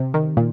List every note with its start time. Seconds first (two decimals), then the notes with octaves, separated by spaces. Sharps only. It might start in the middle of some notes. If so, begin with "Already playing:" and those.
Already playing: C3
0.14 D#3
0.37 A#2